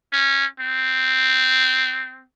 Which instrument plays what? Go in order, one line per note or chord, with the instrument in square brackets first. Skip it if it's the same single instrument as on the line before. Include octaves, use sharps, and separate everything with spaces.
[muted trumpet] C#4
C4